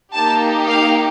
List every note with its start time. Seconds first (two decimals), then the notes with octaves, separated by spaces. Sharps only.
0.13 A#3 D#4 G4 A5
0.68 F5